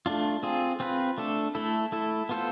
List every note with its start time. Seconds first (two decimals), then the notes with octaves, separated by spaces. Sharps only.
0.06 A3 D4 F4
0.43 C4 F4 G#4
0.80 C4 F4 B4
1.18 A3 D4 A4
1.55 A3 E4 A4
1.92 A3 E4 A4
2.29 B3 F4 A4 C5